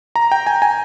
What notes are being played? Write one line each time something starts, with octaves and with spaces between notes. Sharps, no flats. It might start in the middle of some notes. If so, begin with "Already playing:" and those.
A#5
G5
G#5
G#5